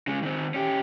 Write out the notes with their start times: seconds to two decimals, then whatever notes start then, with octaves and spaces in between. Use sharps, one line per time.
0.07 C#3 G#3
0.23 D#3 C4
0.54 C#4 G4